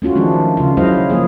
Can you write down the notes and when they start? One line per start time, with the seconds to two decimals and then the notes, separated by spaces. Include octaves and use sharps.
0.02 A3 C#4 F4 F#4
0.15 D#3 F3 G#3 D4
0.57 C#3 F4
0.77 F#3 G#3 E4 C5 D#5 F5
1.10 F3 A#3 G#4